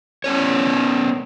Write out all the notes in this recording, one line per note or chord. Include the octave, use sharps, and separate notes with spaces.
B3 C#4 C#5